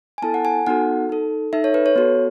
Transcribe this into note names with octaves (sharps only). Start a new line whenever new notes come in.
G#5
B3 E4 A4 A5
F#5
G#5
B3 D#4 F#4 A4 F#5
D#4 A4
D#4 A4 E5
C#5
B4
C#5
B3 F#4 A4